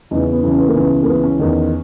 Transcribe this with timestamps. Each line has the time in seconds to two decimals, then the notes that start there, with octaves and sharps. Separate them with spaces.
0.11 E2 C#3 E3 D#4
0.22 C#4
0.33 B3
0.43 E2 C#3 E3 B3
0.51 C#4
0.59 B3
0.68 A#3
0.75 C#2 C#3 E3 B3
1.03 A#3
1.08 C#2 C#3 E3 B3
1.23 C#4
1.39 E2 D#3